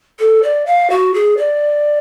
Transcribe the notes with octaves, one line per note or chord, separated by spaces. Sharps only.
A4
D5
F5
F#4
G#4
D5